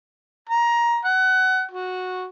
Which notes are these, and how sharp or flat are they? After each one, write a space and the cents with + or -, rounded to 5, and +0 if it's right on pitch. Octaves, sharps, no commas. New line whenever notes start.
A#5 +15
F#5 +25
F#4 -10